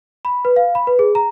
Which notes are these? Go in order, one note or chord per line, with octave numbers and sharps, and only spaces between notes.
B5
B4
F5
B5
B4
G#4
A#5